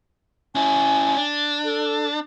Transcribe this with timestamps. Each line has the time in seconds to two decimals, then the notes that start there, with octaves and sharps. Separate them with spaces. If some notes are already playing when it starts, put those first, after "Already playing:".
0.55 C#4 E4 G#5
1.17 D4
1.64 A4